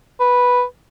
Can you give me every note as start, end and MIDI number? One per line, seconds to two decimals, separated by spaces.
0.20 0.63 71